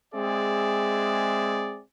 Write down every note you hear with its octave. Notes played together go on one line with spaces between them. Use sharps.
G#3 C4 G#4 D5 E5